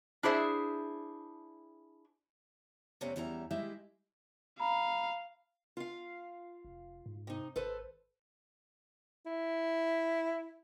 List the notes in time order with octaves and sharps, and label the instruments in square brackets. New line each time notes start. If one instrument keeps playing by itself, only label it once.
[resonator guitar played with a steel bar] D4 E4 G#4 C5 E5
[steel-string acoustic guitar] E2 A2 C3 C4 C#4 D5
E2 G3 C#4 E4 A#5
G3 G#3 E4 G4 D#5 E5
[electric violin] F5 [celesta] A#5 B5
[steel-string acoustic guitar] F4 F5
[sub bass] F1
G#2
[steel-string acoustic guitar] C3 D#4
[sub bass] G#1 [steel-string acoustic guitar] A4 B4 C5
[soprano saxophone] E4